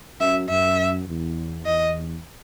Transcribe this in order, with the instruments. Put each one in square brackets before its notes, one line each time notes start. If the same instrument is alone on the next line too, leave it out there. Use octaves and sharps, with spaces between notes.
[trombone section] F#2 [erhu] E5
[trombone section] F#2 [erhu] E5
[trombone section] E2
[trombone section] E2 [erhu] D#5